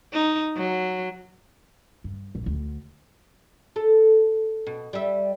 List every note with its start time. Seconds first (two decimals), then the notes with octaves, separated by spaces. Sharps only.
0.14 D#4
0.57 F#3
2.04 G2
2.35 A#1
2.46 D2
3.76 A4
4.67 B2
4.93 G3 E5